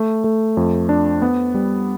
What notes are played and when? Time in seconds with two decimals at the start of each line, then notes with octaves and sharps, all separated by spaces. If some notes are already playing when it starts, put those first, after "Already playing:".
Already playing: A3
0.24 A3
0.57 F2
0.89 D4
1.22 B3
1.54 G3